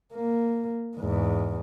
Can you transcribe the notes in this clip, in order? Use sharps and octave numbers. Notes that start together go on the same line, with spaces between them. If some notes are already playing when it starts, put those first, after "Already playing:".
A#3
E2 G#2